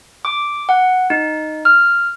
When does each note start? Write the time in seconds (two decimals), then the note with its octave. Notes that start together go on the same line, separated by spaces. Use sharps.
0.25 D6
0.69 F#5
1.10 D#4
1.65 F6